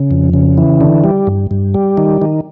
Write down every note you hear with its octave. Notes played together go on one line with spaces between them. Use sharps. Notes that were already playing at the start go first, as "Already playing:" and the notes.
Already playing: C#3
F2
C#3
E3
D3
G3
G2
G2
G3
D#3
D#3